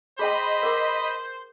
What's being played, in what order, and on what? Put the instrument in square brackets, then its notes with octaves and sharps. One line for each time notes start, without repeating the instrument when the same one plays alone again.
[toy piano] G#4 G5 [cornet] C5 [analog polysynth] D#5 B5
[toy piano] A#4 F#5 D6